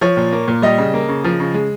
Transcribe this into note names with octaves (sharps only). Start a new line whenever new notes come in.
F3 C#5
A#2
A#3
A#2
G3 D#5
C#3
A#3
C#3
F3
C#3
G#3